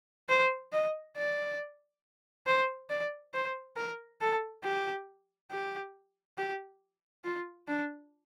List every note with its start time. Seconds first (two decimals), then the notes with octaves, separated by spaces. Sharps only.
0.29 C5
0.73 D#5
1.17 D5
2.47 C5
2.90 D5
3.34 C5
3.77 A#4
4.21 A4
4.64 G4
5.51 G4
6.38 G4
7.24 F4
7.68 D4